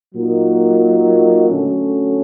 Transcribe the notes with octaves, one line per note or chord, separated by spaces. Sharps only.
A#2 F#3 A#3 D#4
D3 F#3 A3 C#4